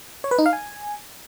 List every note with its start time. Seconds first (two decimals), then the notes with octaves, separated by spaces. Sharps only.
0.24 C#5
0.31 B4
0.38 D#4
0.46 F5
0.53 G#5